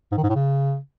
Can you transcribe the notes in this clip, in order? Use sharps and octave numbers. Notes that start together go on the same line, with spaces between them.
G#2
D#3
G#2
A2
C#3